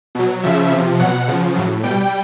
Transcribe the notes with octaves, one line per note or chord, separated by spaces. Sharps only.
B2 F#3
C#3 F3 E5
C3 F3
B2 F#3 F#5
C#3 F3
A2 F#3
B2 G3 G5